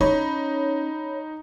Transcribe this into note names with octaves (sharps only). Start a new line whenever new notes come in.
C#4 D#4 C#5 B5